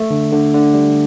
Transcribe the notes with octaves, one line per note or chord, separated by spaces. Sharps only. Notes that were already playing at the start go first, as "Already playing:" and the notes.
Already playing: A3
D3
D3
D3
G3